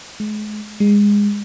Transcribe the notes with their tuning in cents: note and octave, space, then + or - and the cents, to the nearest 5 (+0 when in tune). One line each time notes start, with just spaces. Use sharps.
G#3 +35
G#3 -20